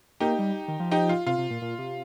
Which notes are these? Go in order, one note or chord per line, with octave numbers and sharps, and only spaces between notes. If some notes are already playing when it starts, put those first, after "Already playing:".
A#3 D#4 G4
G3
D#3
F3
D#4 G4
F4
C3 F4
C3
A#2
A#2
C3